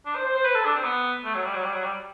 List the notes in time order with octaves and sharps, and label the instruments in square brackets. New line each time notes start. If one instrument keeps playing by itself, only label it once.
[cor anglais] D4
C5
C5
C5
B4
A4
D4
C4
B3
A3
F#3
G3
F#3
G3
F#3
G3